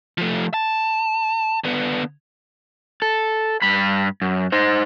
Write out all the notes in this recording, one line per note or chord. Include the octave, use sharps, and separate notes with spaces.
F3 A3
A5
D3 B3
A4
G2 B5
F#2
D#4 C5